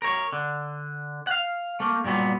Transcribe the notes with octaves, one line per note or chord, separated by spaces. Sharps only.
A#4 C#5
D3
F5 F#5
A3 A#3
G2 A#2 F#3 B3